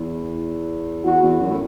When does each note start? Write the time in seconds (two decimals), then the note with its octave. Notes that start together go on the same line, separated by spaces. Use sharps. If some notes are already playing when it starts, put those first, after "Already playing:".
Already playing: E2
1.05 E2 F#4
1.23 E2
1.41 F#2
1.49 A2